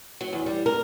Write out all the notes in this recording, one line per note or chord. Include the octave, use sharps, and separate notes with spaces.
F#3
E2
G3
A#4